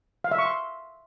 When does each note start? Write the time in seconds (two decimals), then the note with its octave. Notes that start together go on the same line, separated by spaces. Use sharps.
0.24 F5
0.31 E5
0.38 C#6
0.45 C6